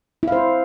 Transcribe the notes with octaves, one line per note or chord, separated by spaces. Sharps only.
E4 C5 F5